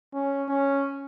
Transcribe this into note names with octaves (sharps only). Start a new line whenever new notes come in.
C#4
C#4